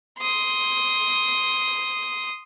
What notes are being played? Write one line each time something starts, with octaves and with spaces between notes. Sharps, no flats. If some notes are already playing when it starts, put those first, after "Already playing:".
C6 D#6